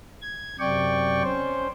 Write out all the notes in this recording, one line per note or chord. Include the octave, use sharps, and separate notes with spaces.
G#6
F#2 C3 D5 G5 C#6
C#4 C5